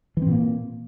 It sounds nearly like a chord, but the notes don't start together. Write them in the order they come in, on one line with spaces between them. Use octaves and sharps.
E3 C4 A#2 A#3